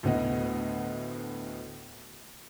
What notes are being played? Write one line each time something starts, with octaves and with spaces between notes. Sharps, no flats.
D2 A2 B3 D#5